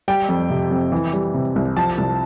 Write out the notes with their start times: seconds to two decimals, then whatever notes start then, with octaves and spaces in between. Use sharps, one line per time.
0.08 G3 G5
0.29 F2
0.50 C3
0.71 F2
0.92 E3
1.13 G3
1.34 C3
1.56 C2
1.77 F3 A5
1.98 C2